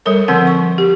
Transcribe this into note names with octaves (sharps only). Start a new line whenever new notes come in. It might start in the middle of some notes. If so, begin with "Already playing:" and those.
G3 A4 A#4 C#5
D3 F3 C4 A#4 F#5
C#6
G4